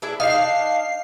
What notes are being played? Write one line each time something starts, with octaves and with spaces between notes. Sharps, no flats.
D4 E4 G#4
D4 D#4 F5 C7